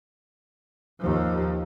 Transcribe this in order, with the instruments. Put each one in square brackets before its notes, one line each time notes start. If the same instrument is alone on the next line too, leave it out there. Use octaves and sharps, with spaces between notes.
[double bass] D#2 F3